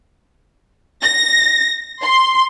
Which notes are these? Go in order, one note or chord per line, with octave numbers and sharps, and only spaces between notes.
A#6
C6